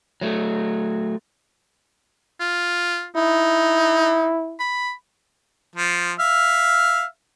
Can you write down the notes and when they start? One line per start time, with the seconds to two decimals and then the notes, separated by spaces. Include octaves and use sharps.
0.21 F#3 A3
2.40 F4
3.16 D#4 E4
4.60 B5
5.76 F3
6.20 E5 F5 F6